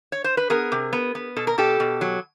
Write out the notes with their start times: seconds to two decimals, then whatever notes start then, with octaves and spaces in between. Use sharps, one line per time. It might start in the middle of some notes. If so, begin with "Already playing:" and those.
0.12 C#5
0.24 C5
0.37 B4
0.50 B3 G#4 A#4
0.72 C3
0.93 B3
1.15 B3
1.36 B2 A4
1.47 A#4
1.58 B2 G4 A4
1.80 B2
2.01 F#3